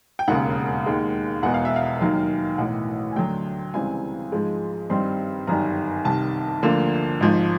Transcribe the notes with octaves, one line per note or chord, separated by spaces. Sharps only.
G5
E1 D#2 C#3 F#5
D#2 D#3 G#3
E1 E2 B2 F#5
F5
E5
F5
D#2 D#3 F#3
B1 A2 E3 F#5
G#5
D2 D3 F#3 G5
C#2 C#3 E3 G3 C4 G#5
G#2 F3 G#3
G2 D#3 G3 C4 D#4 C6
G1 F#2 D#3 G3 A#5
C2 C3 D#3 A5
D2 D3 F3 A#3
G#1 G#2 F3